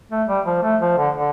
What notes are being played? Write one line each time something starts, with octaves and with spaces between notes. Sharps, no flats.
A3
G3
F3
A3
F3
D3
D3